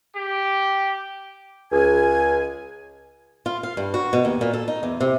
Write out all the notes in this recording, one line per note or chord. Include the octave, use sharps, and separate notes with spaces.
G4
C#2 G#5
F4
F5
G2
F#4
B2
D#2
A#2
A4
D#4
E2
C3